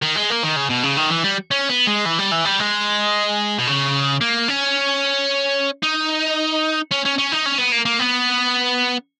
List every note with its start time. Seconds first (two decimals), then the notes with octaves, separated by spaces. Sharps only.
0.02 D#3
0.16 G#3
0.30 A#3
0.43 D#3
0.56 C#3
0.69 B2
0.83 C#3
0.97 D#3
1.10 E3
1.24 G3
1.51 C#4
1.69 B3
1.87 G#3
2.05 E3
2.18 G3
2.31 E3
2.45 G3
2.59 G#3
3.59 B2
3.67 C#3
4.21 A#3
4.48 C#4
5.83 D#4
6.91 C#4
7.05 C#4
7.18 C#4
7.32 D#4
7.46 C#4
7.58 B3
7.72 A#3
7.85 A#3
7.99 B3